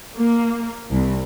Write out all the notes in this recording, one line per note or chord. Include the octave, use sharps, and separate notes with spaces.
A#3
C2